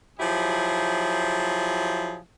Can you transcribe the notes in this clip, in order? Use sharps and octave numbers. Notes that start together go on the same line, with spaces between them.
F3 F#3 E4 G4 G#4